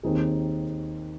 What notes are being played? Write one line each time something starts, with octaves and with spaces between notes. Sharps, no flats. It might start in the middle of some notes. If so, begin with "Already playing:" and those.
D#2 D#3 C4 D#4 G#4